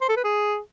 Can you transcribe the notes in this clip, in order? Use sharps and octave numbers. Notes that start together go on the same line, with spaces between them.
C5
A4
B4
G#4